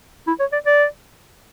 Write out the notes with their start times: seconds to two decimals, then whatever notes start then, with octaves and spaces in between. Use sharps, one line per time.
0.28 E4
0.40 C#5
0.53 D5
0.66 D5